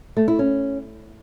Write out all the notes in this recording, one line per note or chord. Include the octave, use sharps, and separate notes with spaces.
A3
E4
C#4